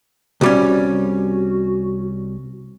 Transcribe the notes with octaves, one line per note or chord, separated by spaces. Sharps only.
C2 G3 C#4 F#4